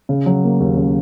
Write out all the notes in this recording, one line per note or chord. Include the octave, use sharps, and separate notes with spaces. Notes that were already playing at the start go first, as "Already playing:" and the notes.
C#3
F#3
A#3
D#2
C#3